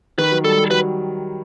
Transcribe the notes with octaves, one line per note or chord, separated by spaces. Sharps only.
D#3 B4
F#3
G3 A4
G3
F#3 B4